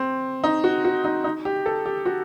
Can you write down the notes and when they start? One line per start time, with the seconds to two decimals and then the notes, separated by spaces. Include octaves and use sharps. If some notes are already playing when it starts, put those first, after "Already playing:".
Already playing: C4
0.44 D#4
0.64 F#4
0.84 F#4
1.04 D#4
1.24 D#4
1.45 G4
1.66 A4
1.86 G4
2.06 F#4